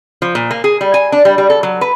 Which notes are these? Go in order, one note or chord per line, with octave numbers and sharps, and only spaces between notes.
F3
A#2
A#3
G#4
G3
G#5
D4
G3
G3
A4
F#3
B4